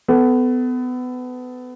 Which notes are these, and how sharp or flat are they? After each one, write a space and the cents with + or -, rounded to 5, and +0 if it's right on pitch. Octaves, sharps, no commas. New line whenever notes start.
B3 +25 A4 +0